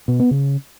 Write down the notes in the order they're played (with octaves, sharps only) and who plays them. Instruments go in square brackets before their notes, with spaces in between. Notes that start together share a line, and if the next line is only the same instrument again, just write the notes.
[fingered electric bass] B2
B3
C#3